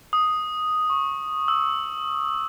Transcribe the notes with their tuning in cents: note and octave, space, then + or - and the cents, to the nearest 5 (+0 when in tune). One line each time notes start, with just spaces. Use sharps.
D#6 +0
C#6 -10
E6 -5